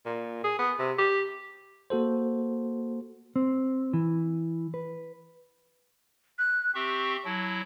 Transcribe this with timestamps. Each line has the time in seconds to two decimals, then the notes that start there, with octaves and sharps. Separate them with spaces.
0.05 A#2
0.44 G#4
0.59 B3
0.79 C3
0.98 G4
1.90 A#3 F#4 A4 C5
3.36 C4
3.93 E3
4.74 B4
6.39 F#6
6.75 C4 G4 E5 C#6
7.25 F#3 E4 A5